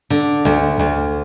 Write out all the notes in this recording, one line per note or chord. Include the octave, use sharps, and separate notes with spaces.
D3
D2
D2